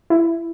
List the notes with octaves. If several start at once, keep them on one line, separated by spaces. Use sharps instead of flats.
E4